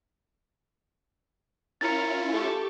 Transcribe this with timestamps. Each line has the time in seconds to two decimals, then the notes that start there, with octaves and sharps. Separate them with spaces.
1.81 C#4 E4 F4 A#4 A6 C#7
2.31 A3 G4 A4 C#6